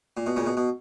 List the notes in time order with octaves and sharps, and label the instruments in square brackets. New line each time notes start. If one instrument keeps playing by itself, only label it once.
[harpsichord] A#2
B2
A#2 C#3
B2
B2